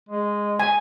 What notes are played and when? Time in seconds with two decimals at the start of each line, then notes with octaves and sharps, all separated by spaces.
0.09 G#3
0.59 G#5